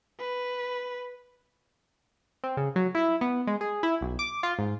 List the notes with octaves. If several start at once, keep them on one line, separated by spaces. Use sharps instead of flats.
B4
C4
C#3
F#3
E4
B3
G#3
G#4
E4
B1
D6
F4
G#2